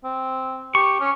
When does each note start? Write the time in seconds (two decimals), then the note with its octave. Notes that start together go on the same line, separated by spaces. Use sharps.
0.04 C4
0.75 G4 C#6
1.00 C#4